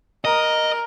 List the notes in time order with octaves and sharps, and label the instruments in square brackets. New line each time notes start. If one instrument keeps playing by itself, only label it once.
[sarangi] A#4 [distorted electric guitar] D#5